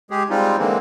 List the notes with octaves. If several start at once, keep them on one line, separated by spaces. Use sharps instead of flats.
G#3 G4 G#4
G3 G#3 C4 D#4 F4
D3 E3 G#3 A#3 C4